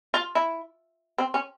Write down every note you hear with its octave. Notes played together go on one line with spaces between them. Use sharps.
F4
E4
C4
C#4